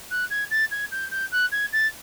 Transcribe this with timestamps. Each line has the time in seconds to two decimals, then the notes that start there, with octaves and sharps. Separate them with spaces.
0.10 F#6
0.30 G#6
0.51 A6
0.71 G#6
0.91 G6
1.11 G6
1.31 F#6
1.52 G#6
1.73 A6